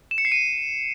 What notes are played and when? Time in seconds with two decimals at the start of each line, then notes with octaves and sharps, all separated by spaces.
0.11 E7
0.18 C#7
0.25 C7
0.32 D#7